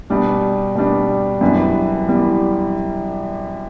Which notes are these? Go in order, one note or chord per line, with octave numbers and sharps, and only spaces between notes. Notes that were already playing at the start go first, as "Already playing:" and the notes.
B2 G3 D4
B2 G3 D4
F#2 E3 G3 B3 D4
E3 G3 B3